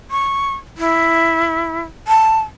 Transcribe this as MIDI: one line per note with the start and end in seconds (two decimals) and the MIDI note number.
0.11 0.54 85
0.78 1.81 64
2.08 2.40 81